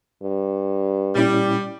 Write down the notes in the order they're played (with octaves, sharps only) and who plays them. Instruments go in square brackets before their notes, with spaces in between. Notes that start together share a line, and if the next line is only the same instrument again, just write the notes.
[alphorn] G2
[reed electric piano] A#2 C#4 E4 [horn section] G3